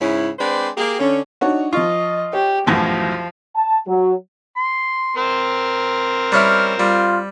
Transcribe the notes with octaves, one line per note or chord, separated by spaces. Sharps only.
G#2 C#3 C#4 E4
G#3 C4 D4 B4 C5 D5
A#3 G4 G#4
D3 C#4
D4 D#4 F#4 C#5
F3 F4 D#5 C#6
G4 C#5
B1 F#2 A2 E3 F3 G#6 A#6
A5
F#3
C6
C4 A#4 C5
G3 C#4 E4 F6
G3 F4